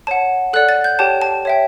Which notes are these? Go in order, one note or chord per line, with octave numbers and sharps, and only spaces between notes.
C#5 F#5 A5
A4 D5 F#5 F#6
A6
G6
G4 C#5 G5 A5
A5
C#5 E5 G5